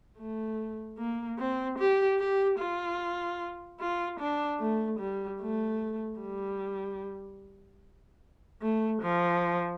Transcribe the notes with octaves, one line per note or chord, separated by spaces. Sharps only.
A3
A#3
C4
G4
G4
F4
F4
D4
A3
G3
A3
G3
A3
F3